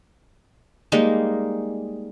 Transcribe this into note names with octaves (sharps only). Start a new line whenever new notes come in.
G3 G#3 A#3 D#4